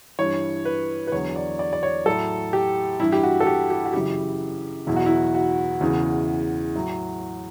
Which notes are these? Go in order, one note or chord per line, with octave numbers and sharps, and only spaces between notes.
G2 E3 C#5
B4
B4
E2 D3 F#3 C#5
D5
D5
D5
C#5
A2 F#3 A4
G4
G2 E3 E4
G4
F#4
A4
G4
G4
F#4
F#2 C#3 E3 G4
E2 B2 F#3 E4
F#4
E4
F#4
E2 C#3 E3
A2 F#3